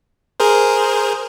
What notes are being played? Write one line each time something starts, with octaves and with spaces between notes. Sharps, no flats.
G#4 A#4 C5